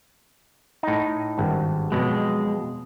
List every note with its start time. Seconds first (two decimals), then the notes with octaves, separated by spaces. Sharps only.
0.83 A2 D#4
1.38 G#1 G2
1.92 F2 B2 F#3 G#3